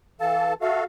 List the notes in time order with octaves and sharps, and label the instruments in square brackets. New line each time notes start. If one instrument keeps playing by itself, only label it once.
[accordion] E3 A4 A5 [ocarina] F5
[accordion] F#4 A4 F5 [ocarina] E5